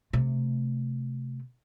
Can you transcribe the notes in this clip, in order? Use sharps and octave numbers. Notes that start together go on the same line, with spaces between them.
C3 A3